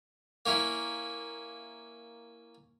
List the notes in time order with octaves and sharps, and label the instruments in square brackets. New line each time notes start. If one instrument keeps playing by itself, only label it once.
[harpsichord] A#3 C#4 E4